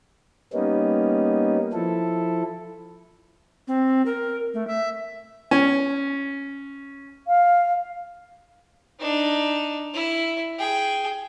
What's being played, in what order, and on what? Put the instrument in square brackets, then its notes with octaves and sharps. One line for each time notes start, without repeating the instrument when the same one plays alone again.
[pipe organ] G3 A#3 B3 C#4 D#4
F3 E4 A4
[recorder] C4
A#4
A3
E5
[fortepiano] C#4
[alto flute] F5
[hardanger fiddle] D4 D#4
E4
G#4 G5